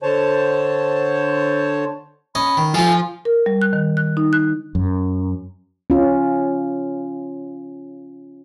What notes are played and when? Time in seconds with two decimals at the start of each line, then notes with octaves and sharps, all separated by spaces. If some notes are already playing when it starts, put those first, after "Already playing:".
0.03 D3 C5 C#5 A5
2.35 C#4 D#5 B5
2.57 D#3
2.74 F3 F4 A4 G#5
3.25 A#4
3.46 G3
3.62 F#6
3.73 D#3
3.97 F#6
4.17 D#4
4.33 F#6
4.75 F#2
5.90 C#4 F4